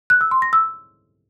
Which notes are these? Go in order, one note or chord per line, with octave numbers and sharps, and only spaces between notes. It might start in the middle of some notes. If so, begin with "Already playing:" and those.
F#6
E6
C6
A#6
E6